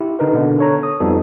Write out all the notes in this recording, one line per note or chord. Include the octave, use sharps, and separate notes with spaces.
E4 G4
D3 D#4 A#4 B4
B2 D3 B3
A4 C#5 A#5
D#6
F2 F3 G3 B3 D#4 A4